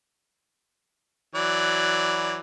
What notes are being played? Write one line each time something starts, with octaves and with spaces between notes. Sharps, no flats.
E3 F#3 D5